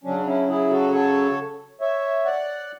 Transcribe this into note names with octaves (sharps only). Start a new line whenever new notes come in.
C#3 F#3 C#4 D4
C#4 E4
E4 G#4
F#4 A4
A4 C#5
C#5 E5
D5 F#5